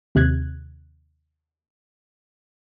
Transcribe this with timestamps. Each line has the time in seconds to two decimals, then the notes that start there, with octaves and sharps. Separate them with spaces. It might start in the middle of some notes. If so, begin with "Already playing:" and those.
0.15 D#2 C3 F#6 G#6